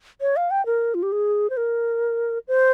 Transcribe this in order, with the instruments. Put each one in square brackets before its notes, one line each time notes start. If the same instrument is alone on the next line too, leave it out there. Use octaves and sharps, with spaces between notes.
[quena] C#5
F5
G5
A#4
F4
G4
G#4
C5
A#4
C5